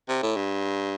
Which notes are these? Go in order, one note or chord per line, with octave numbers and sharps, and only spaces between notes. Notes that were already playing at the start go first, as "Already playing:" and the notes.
C3
A2
G2